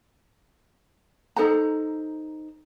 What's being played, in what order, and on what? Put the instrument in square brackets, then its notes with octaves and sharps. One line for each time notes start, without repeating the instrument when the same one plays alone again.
[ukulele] D#4 A4 C5 A#5